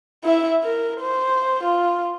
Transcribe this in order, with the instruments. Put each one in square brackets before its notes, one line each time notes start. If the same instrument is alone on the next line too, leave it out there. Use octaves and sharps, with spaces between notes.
[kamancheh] E4 E5
A#4
C5
F4